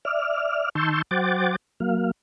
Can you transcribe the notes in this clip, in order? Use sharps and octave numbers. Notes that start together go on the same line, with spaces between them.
D5 E5 F6
D#3 A5 C6 C#6 E6 G6
F#3 C5 F#5 G5 D6 A6
F#3 A#3 F5